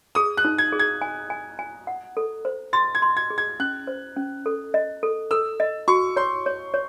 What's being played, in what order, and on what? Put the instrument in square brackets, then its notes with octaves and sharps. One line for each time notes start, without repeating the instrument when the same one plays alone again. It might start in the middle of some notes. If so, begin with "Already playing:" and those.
[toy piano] G#4 [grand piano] D#6
[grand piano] F#6
[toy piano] D#4
[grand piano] G#6
[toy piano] G#4
[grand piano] G#6
[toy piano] G#5
G#5
G#5
F#5
A4
C5
[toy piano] C6 [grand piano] A6
[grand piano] G#6
[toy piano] C6
[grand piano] G#6
[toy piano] G#4
[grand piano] G#6
[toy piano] C#4 [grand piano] F#6
[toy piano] C5
C#4
A4
D#5
A4
[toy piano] A4 [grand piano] E6
[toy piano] D#5
[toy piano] F#4 [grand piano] C#6
[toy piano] C#5 [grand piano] C6
[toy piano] C#5
C#5